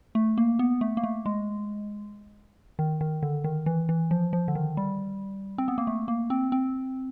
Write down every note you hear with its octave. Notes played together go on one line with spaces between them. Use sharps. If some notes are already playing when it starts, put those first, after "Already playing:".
A3
A#3
B3
A3
A#3
A3
G#3
D#3
D#3
D3
D#3
E3
E3
F3
F3
D3
D#3
G3
C4
B3
A#3
A3
A#3
C4
C4